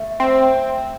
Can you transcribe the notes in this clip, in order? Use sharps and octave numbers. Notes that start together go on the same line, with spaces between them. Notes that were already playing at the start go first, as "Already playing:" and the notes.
Already playing: A3
C4